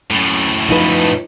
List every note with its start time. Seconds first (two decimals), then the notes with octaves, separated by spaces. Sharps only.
0.10 F#2 A2
0.69 F3 D#4 B4